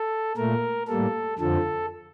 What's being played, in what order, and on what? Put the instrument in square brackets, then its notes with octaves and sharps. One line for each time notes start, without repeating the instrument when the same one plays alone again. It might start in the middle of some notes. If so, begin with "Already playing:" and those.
Already playing: [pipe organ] A4
A#2 A3 A#4
A2 G3 A#3 A4
F2 D3 F3 A4